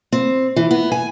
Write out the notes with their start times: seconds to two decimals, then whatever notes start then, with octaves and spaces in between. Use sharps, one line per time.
0.12 C4
0.56 E3
0.71 B3
0.92 G#5